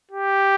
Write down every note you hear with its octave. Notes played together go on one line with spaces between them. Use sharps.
G4